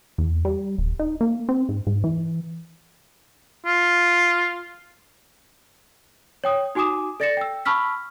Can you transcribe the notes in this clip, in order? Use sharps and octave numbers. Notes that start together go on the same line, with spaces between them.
E2
G3
D#1
D#4
A#3
C4
G#2
G#2
E3
F4
C#5 G5 D#6
D#4 F#4 G#5 D6 D#6 E7
A4 D5 A6 A#6 C#7 E7
G5 E6
A5 B5 C#6 E6 F6 B6